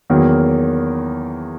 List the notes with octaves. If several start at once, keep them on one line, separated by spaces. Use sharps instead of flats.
E2 D#3 F#3 A#3